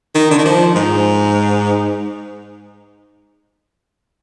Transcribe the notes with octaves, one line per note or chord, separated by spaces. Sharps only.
D#3
D3
D#3
F3
G#2